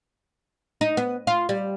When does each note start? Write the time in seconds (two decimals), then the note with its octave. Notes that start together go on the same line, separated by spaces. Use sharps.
0.81 D#4
0.97 B3
1.27 F4
1.49 G3